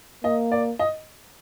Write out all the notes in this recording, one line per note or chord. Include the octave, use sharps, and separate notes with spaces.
A#3 D#5
D5
D#5